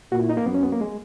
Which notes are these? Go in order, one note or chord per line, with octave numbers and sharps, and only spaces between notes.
A#2 F#4
E4
D#4
A#3
F#2 B3
C#4
B3
A#3
G#3